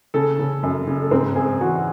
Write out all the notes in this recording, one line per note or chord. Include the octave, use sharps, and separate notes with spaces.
C#3 A4
C#3
F#2
C#3
A4
G#2 C4 C5
G#2 G#4 G#5
E3 F#4 F#5